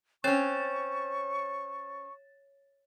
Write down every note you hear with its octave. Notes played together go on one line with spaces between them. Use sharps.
C4 C#4 C#5 C#6 A6